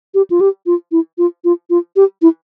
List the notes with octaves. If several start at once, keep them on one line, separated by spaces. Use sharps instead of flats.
G4
F4
G4
F4
E4
F4
F4
F4
G4
E4